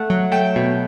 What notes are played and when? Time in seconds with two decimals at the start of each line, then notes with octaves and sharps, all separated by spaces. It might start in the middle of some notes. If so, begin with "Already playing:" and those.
Already playing: A3 F#5
0.10 F#3
0.32 A3 G5
0.56 B2